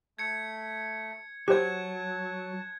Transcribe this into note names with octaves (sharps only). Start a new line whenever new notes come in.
A3 G#6 C#7
F#3 G4 C5 A5 F#6 G#6